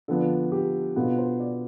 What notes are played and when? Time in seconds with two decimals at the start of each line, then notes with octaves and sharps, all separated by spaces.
0.08 D3 F3 B3 D4 A4
0.52 G4
0.96 B2 B3 D4 F4 A4
1.18 C5
1.40 D5